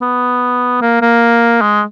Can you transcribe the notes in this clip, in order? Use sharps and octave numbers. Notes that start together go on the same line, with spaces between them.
B3
A#3
A#3
G#3